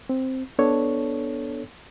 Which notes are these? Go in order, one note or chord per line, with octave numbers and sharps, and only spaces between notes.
C4
B3 D4 A4 C#5